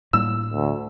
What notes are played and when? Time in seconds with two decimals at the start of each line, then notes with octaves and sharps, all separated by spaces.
0.13 A2 G3 A#3 E6
0.53 D2